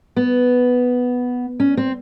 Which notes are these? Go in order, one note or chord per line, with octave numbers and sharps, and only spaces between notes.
B3
C#4
C4